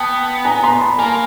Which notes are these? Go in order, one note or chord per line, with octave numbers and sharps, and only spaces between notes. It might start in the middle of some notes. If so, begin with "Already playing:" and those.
Already playing: B3 G5 A5
G#5 A#5
A#5 C6
A5 B5
A#3 G#5 A#5